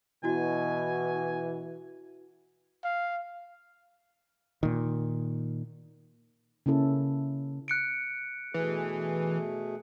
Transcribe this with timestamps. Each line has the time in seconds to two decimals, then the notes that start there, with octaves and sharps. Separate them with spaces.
0.24 B2 E3 E4 F#4 G#5
2.84 F5
4.63 A#2 D#3
6.66 C#3 A#3 C#4 E4 A4
7.68 F#6 C#7 D7
8.54 B2 E3 A3 G#4